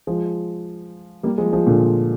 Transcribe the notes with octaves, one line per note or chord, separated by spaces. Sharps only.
F3 G#3
G3 A#3
F3 G#3
F3 G#3
A#2 D3